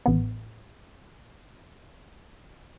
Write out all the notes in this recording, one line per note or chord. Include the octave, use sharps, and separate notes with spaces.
A1 B3